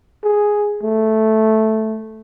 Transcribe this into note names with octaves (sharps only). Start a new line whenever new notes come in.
G#4
A3